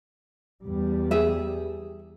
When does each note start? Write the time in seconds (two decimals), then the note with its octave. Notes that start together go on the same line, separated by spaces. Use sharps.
0.65 E2 G3
1.11 G#4 E5